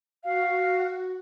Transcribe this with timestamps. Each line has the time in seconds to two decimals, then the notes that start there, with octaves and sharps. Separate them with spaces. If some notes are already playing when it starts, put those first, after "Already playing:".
0.24 F#4 F5